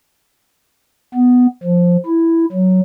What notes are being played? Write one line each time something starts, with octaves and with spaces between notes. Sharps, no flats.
B3
F3
E4
F#3